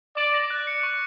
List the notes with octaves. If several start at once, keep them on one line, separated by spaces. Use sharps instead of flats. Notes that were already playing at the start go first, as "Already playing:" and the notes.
D5 D6
A#6
F#6
C#7
C#6